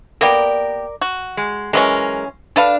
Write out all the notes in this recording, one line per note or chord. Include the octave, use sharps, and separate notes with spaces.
A#3 B3 G4 A#4 D5
F#4
G#3
E3 F#3 G#3 C#4 A#4
D4 A4 B4 F5